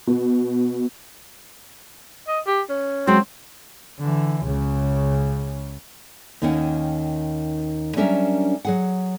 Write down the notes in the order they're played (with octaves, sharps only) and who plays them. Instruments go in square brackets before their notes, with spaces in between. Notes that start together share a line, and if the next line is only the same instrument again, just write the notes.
[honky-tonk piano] B2
[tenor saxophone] D#5
G4
C#4
[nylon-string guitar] F#3 G#3 F#4 [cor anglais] C4
[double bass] D3 E3
C#2 C#3
[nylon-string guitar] D#2 D#3 A#3 C#4 F#5 G5
F#3 G3 C#4 D4 A#4 E5
F#3 G#4 F#5